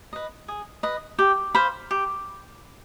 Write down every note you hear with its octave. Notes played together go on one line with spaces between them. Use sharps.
B4 D#5
G#4
B4 D#5
G4
C5 F5 B5
G4